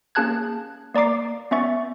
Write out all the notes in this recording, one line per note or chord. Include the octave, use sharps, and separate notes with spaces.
A#3 C#4 G#4 A5 F#6 G#6
A#3 D5 A#5 D6 C7
B3 C#4 E5 C#6 A6